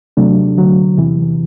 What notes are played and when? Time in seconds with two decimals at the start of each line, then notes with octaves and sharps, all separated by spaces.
0.17 C3 F#3 A3 D4
0.58 D2 D3 F#3
0.97 E2 C3 E3